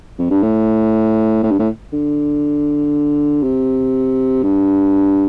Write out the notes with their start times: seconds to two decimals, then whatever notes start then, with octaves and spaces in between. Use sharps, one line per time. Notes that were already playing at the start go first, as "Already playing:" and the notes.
0.18 F2
0.30 G2
0.42 A2
1.43 A2
1.51 G2
1.59 A2
1.92 D3
3.43 C3
4.43 G2